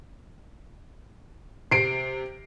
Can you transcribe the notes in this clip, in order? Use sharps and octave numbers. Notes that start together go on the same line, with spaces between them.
C3 C7 D7